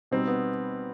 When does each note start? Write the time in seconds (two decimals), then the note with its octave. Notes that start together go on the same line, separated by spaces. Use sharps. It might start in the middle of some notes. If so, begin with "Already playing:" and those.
0.11 B2 G3 C4 D#4
0.27 B3